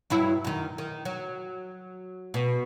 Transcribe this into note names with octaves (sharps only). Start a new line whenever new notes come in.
G2 F#3 E4
F#2 D#3
D#3
F#3
B2